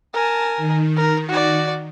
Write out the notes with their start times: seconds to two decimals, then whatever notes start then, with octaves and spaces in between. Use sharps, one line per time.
0.13 A#4 G#5 A5
0.57 D#3
0.96 A#4
1.29 F#4 D5